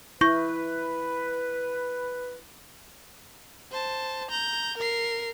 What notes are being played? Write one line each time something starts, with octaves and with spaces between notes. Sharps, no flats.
E4 B4 C#6 G6 A#6
C5 A5
A#5 G6
A#4 C7